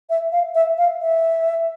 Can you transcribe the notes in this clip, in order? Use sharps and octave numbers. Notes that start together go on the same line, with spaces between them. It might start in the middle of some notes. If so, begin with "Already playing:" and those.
E5
F5
E5
F5
E5